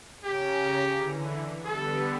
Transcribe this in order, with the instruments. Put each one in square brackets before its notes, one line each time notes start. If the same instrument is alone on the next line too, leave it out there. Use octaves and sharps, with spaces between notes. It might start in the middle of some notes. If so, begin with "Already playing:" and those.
[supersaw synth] C#3 C#4 A#5 [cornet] G4
[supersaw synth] D3 E3
[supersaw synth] D3 G3 B3 [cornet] A4